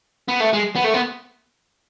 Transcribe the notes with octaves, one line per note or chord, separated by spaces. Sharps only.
B3
A3
G#3
B3
A3
B3